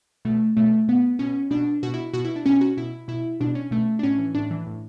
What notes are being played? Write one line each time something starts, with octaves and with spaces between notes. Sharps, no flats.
B2 A3
B2 A3
B2 B3
B2 C#4
B2 D4
B2 F#4
E4
B2 F#4
E4
D4
B2 C#4
F#4
B2 E4
B2 E4
B2 D4
C#4
B2 A3
D4
A2 C#4
E3
A2 D4
E3
A2